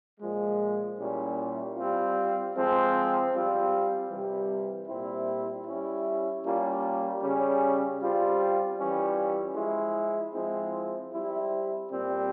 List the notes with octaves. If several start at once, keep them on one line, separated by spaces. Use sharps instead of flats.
A#2 F3 G#3
A#2 G3 C#4 E4
G3 C4 F4
F3 G#3 C4
G3 C4 F4
C3 E3 G3
A#2 G3 C4 E4
G3 C#4 E4
G3 A#3 C#4 F4
C#3 G3 C#4
G3 C4 F4
E3 G3 C#4 F4
F3 G#3 E4
F3 G#3 C4 E4
G3 C4 E4
A#2 G3 C4